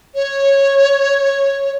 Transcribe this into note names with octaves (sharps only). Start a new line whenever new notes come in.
C#5